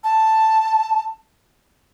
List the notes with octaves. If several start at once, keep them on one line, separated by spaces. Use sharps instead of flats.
A5